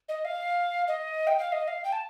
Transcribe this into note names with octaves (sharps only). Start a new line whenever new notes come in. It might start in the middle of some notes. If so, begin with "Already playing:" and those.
D#5
F5
D#5
G5
F5
D#5
F5
G5
A5